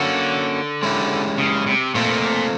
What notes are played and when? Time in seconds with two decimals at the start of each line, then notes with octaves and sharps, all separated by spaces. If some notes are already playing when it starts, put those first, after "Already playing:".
Already playing: D3 A#3 C#4 F#4
0.83 G#3 C#4 E4 G4
1.38 C#3
1.66 C3
1.95 A#2 A3 C4 F4 A4